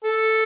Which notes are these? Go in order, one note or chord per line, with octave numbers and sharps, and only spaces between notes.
A4